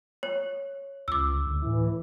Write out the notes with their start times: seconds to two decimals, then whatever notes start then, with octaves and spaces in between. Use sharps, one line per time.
0.23 C#5
1.08 C#2 D6 E6
1.46 D2
1.62 A2 E3